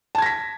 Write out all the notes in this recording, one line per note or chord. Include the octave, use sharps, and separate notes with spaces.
A5 G#6 A#6 B6